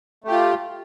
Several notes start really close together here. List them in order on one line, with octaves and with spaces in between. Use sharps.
A3 G4 F4